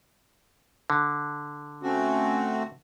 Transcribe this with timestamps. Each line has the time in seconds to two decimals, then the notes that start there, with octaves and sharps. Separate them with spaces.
0.90 D3
1.83 A3 C4 C#4 F#4